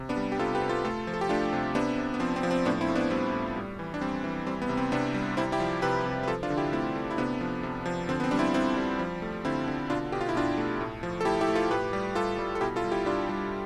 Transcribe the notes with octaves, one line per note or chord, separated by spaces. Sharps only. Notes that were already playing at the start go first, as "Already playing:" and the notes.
Already playing: C3
B3 D4
G3
G4
C3 F4 A4
G4 B4
C3
F4 A4
A3 F4 A4
F3
A4
G4
A3 D4 F4
C3
C3 B3 D4
C3
B3
F3 C4
C4
F3
C4
A2 B3 D4
C4 E4
A2
B3 D4
G3 C4
A2
G3
E3
D4
G3 C4
E3
G3 C4
B3
C3
C4
C3 B3 D4
G3
C3 C4 E4
E4 G4
F3
C3 G4 B4
C3
B4
F3 F4 A4
D4 F4
D3
E4 G4
A3 C4 E4
A3
E4
C3 B3 D4
F3
C3
F3
D3 C4
B3
C4
G3 D4
C4 E4
G3 C4 E4
G3
F3
A3
D3 C4 E4
D3
B2 D4 F4
B2 G4
F4
E4
B2 D4 F4
A3
A2
F3
A4
A3 E4 G4
E4 G4
A3
F4 A4
A2 G4 B4
G3
G3 F4 A4
G3
A4
B2 E4 G4
F4 A4
G3
E4 G4
G3 D4 F4
G3